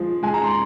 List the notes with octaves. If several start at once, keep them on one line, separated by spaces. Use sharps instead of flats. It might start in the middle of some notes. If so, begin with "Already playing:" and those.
Already playing: F3 G#3
G#3 G#5
A#5
C6